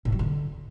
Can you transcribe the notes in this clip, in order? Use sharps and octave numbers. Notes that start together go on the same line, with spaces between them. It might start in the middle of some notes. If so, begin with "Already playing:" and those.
A2
F#3
D3